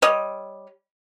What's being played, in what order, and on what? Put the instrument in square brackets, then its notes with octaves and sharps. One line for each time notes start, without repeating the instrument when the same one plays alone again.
[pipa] G3 C#5 D#5